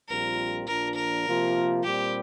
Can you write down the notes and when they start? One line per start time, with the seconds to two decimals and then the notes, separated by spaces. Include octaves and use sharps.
0.09 A#1 A#2 G3 C4 F4 A#4
0.67 A#1 A#2 F3 D4 A#4
0.96 A#4
1.26 C3 F3 A#3 F4
1.83 A#2 G3 C4 G4